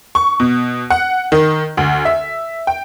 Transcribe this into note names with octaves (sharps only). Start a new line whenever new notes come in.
C#6
B2
F#5
D#3
D2
E5
G5